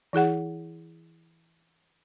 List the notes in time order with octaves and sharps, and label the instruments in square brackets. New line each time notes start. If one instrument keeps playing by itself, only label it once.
[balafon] E3 E4 G#4 F#5